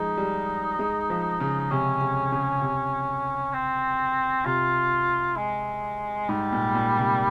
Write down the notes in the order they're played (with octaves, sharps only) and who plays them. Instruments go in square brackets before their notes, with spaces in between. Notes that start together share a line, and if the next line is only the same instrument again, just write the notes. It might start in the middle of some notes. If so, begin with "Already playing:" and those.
Already playing: [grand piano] F3 G#3 [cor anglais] D#4
[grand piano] G3
G#3
F3
C#3
[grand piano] C3 [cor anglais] C#4
[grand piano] C3
C#3
C3
[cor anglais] C4
[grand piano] C3 [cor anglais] F4
[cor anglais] G#3
[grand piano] G#2 [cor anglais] G3
[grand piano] A#2
A#2
C3